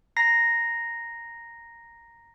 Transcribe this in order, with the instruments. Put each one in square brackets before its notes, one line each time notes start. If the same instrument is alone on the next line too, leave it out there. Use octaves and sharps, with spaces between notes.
[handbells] A#5 A#6 C7